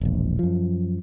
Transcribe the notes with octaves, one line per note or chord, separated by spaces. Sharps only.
E1 A#1
F#2 F3